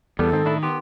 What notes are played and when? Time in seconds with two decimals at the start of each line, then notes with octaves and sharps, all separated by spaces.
0.19 E2 G3 B3 A4
0.33 G#2 D#3 C4
0.45 A2 D4 E4
0.63 B3 G4 C6